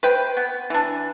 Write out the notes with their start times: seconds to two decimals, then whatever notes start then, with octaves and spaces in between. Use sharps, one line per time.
0.03 B4 C5 G5
0.37 B3
0.70 E3 D4